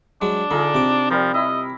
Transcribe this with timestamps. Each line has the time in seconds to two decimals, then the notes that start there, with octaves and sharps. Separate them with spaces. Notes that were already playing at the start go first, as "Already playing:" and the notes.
0.22 F#3 G#3 D4
0.51 D3 D#4 F4 G#4
0.74 C3 D6
1.11 F3 G3 A#4
1.34 E4 D#5